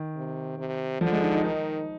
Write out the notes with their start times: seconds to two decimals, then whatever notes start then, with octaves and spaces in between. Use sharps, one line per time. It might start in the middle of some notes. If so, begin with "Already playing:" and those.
Already playing: D#3
0.16 C3
0.58 C3
1.01 D3 F3
1.12 G#3
1.22 D#4
1.33 D#4
1.44 D#3 D#4